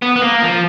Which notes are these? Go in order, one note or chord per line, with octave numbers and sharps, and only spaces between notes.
B3
B3
A#3
F3